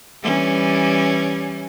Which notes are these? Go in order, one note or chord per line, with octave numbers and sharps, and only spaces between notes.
E3 G3 C#4